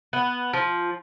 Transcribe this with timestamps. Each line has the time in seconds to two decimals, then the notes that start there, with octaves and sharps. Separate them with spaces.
0.13 B3
0.53 F3